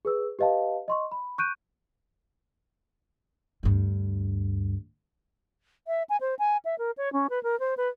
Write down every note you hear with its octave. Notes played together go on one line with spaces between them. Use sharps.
G#4 B4 E6
G4 B4 D#5 F5 A5
D#5 C6 C#6
B5
C#6 F#6 G6 D7 D#7
D2 G2
E5
G#5
C5
G#5
E5
A#4
C#5
C#4
B4
A#4
C5
B4